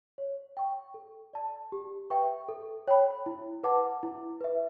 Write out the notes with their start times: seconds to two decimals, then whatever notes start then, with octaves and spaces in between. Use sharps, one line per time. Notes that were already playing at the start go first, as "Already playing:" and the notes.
0.18 C#5
0.57 G5 C#6
0.94 A4
1.33 D5 A5
1.72 G4
2.10 B4 E5 G5 C#6
2.49 A4
2.88 C#5 G5 B5
3.26 E4
3.64 B4 F#5 A5 D6
4.03 E4
4.41 B4 E5